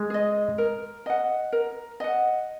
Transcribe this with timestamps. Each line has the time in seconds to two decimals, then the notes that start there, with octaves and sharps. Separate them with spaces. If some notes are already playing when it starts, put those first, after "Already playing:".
Already playing: G#3
0.10 G#4 D#5
0.58 A#4
1.06 D#5 F#5
1.53 A#4
2.00 D#5 F#5